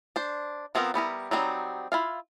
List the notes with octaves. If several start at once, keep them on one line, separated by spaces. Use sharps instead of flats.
D4 C5
F3 B3 C4 F4 A#4
G3 B3 E4 A#4
F#3 G3 C4 D4 D#4
E4 F4 F5